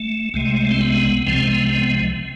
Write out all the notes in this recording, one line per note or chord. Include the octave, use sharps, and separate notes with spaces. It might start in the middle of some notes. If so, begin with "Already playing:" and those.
Already playing: A3
C2 C3 G#3 A3
C4
B3
C2 C3 F3 G#3 C4
B3
B3